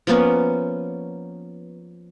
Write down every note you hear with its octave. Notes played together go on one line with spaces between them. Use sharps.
F3 A#3 B3 C#4